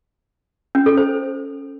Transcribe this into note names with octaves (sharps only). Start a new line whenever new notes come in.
C#4
A4
C5